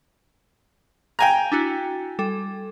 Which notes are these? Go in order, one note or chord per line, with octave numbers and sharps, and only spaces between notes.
G5 G#5 A#5
D4 E4 F#4
G3 A4